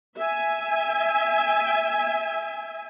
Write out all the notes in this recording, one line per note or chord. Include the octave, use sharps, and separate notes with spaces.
E5 G#5